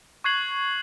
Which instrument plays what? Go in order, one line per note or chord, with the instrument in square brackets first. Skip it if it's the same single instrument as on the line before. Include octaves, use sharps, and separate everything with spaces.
[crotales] C#6 F#6 G#6 C7 F#7